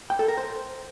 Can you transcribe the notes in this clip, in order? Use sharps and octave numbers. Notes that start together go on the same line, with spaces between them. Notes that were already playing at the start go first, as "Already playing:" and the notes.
G5
A4
A#4
C5